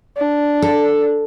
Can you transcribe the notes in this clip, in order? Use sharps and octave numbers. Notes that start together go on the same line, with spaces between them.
D4
A4